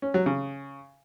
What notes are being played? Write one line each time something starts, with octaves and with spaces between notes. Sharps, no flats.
C#4
F#3
C#3